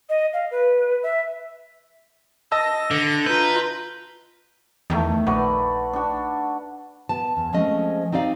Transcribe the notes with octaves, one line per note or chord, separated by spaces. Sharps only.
D#5
F5
B4
E5
D#5 A5 E6 A#6
D3
F4 B4 A#5 G6
E2 D#3 A3
A#1 F#4 B4 D5
D4 F#4
B3 A5
E2
F3 G#3 A3 C4 C#4 D#5
C4 D#4 G4 D5 F5